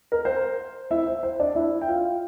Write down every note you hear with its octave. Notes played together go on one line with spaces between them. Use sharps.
A#4
C5
E4 E5
C5
C5
D4 D5
E4 E5
G5
F4 F5